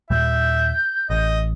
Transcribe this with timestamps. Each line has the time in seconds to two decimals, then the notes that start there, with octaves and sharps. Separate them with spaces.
0.10 D#2 A#2 G3 E5 G6
1.10 A1 D#5